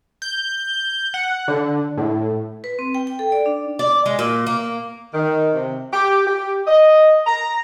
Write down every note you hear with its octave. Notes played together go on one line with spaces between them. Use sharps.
G6
F#5
D3
A2
B4
C4
G5
G5
A4
D5
D4
D5
G#3
A#2
A#3
D#3
C3
G4
G4
D#5
A#5